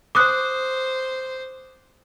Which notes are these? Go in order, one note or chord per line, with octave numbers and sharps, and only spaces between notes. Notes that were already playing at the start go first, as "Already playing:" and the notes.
C5 D6 D#6 F#6